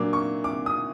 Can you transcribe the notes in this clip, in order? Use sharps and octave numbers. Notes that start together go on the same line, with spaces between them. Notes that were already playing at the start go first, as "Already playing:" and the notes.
Already playing: A#2 F#3 A#3 D4 D6
C#6
D6
D#6